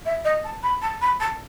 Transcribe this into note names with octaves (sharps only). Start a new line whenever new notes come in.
E5
D#5
A5
B5
A5
B5
A5